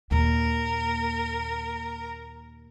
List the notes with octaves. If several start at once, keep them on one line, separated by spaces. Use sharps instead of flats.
D#2 A#2 A#4